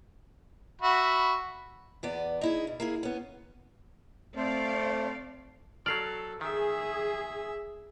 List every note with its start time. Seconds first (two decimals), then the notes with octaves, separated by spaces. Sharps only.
0.82 F#4 E5 B5
2.03 E2 B3 D5
2.41 D#4 E4 G#4
2.67 B2
2.80 A#3 E4 G#4
3.03 B3 C#4
4.36 A3 C4 C5 D5 F5
5.86 F#3 A4 D5 F6 C7
6.41 D#3 G#4 E5